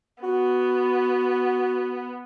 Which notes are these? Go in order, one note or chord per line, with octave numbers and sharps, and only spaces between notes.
B3 F#4